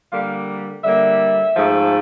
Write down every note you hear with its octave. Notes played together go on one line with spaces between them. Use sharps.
D3 G3 A#3 F5
D3 G3 A#3 E5
G#2 F3 A3